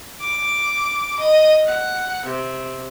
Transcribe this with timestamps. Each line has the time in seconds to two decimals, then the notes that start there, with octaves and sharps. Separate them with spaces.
0.20 D6
1.18 D#5
1.66 F#5
2.26 C3